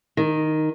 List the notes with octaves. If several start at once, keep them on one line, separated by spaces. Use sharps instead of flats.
D#3